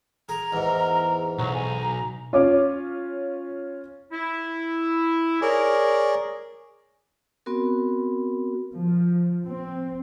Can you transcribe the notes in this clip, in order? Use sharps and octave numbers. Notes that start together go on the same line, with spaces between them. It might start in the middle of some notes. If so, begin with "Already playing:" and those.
G#4 A#5
E2 G#2 A#4
B1 F#3 A#5
G#5
C#4 F4 C#5 D6
E4
G#4 A#4 C#5 D5
B3 C4 F#4 A#4
F3
C4